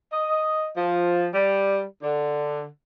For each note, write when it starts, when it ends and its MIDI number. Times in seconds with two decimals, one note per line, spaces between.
0.12 0.69 75
0.76 1.27 53
1.34 1.83 55
2.03 2.64 50